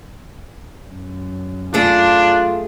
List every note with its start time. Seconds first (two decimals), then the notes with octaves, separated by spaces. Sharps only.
0.88 F#2
1.74 A3 D4 F4 G#4